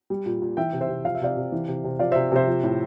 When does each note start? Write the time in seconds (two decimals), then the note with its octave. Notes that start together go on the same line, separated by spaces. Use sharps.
0.10 G3
0.26 A#2
0.42 A#2
0.57 E3 E5 G5
0.73 C3
0.81 C5 E5
0.89 C3
1.04 F3 F5
1.15 E5
1.21 C3 D5 F5
1.37 C3
1.52 E3
1.68 C3
1.84 C3
1.99 F3 D5 F5
2.12 C3 C5 E5
2.32 C3 C5 E5
2.47 F3
2.63 A2